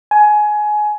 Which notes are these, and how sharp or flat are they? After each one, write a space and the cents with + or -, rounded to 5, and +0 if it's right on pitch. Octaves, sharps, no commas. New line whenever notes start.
G#5 +20